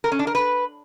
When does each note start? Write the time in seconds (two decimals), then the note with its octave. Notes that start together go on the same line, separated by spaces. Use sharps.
0.04 A#4
0.12 C#4
0.19 D4
0.27 A#4
0.35 B4